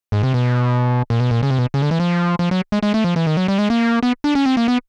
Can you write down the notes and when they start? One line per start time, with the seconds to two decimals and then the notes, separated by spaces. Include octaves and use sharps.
0.12 G#2
0.23 C3
0.34 B2
1.10 A#2
1.20 B2
1.31 A#2
1.43 C#3
1.51 C3
1.58 B2
1.74 C#3
1.82 D3
1.91 E3
2.00 F3
2.39 F3
2.51 F#3
2.72 G#3
2.83 G#3
2.94 A3
3.04 F3
3.16 E3
3.27 D#3
3.37 F#3
3.48 G3
3.59 G#3
3.70 A#3
4.03 B3
4.24 D4
4.35 C#4
4.46 C4
4.57 A#3
4.68 B3